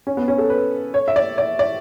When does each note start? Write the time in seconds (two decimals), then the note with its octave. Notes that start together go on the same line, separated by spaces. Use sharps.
0.07 C#4
0.17 B3
0.28 C#4
0.38 A4
0.50 B4
0.94 C#5
1.08 E5
1.16 D5
1.38 D5
1.59 D5